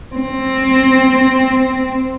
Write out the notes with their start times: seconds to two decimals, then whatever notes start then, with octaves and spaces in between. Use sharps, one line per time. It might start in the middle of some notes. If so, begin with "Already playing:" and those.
0.16 C4